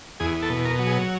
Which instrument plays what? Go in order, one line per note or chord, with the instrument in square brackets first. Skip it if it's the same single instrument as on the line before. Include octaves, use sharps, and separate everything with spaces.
[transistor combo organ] E2 G#4
A4
B2
A#4
F#3
G#4